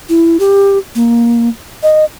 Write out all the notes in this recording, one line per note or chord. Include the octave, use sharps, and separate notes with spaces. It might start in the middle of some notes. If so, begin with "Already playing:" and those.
E4
G4
A#3
D#5